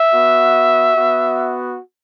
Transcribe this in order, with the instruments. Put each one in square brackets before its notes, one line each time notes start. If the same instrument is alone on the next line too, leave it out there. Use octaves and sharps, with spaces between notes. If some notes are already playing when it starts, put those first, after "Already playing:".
Already playing: [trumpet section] E5
B3 F#4
B3 F#4